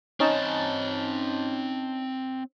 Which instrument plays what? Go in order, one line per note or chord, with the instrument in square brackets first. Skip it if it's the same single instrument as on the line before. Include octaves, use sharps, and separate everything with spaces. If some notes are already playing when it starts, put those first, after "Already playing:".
[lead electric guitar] C4 D#5 [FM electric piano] C#4 D#4 A5